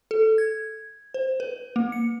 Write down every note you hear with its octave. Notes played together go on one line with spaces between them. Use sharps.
A4
G#6
C5
B4
A#3
C#7